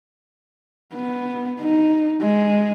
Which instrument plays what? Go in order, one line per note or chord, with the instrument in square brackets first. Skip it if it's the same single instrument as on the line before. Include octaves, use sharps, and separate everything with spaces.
[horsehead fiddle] B3
D#4
G#3